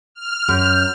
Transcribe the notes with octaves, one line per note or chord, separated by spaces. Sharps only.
F6
F#2 G6